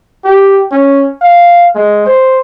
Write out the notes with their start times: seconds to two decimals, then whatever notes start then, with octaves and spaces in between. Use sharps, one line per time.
0.25 G4
0.71 C#4
1.21 F5
1.75 G#3
2.06 C5